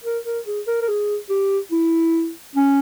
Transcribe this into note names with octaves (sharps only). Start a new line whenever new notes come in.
A#4
A#4
G#4
A#4
A#4
G#4
G4
E4
C#4